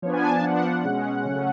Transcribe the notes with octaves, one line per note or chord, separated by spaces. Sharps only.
F3 B3 D4 C#5
G#5
A5
G#5
F3 B3 D4 F#5
B2 G#3 C#4
C#3 F#3 A3 C#4